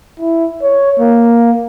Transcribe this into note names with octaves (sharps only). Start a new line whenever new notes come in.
E4
C#5
A#3